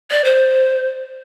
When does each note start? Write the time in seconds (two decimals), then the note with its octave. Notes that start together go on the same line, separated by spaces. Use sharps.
0.10 D5
0.24 C5